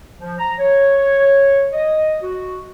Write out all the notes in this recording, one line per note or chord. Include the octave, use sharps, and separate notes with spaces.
F3
A#5
C#5
D#5
F#4